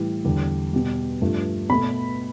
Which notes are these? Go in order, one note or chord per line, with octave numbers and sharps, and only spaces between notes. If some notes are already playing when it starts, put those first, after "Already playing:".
Already playing: A2 E3 G3
E2 D3 G3
B2 G3
G2 F3 A3
B2 A3 B5